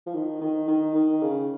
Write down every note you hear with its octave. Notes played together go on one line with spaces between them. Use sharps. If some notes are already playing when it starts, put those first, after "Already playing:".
F3
D#3
D#3
D#3
D#3
C#3